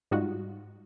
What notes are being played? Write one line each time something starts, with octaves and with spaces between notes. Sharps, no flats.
G#2 G3 D#4 F4 F#4